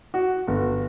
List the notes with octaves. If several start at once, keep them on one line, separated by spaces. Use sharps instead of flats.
F#4
G1